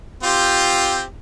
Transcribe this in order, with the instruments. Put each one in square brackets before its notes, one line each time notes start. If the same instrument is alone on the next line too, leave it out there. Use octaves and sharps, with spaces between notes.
[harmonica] C4 F4 G4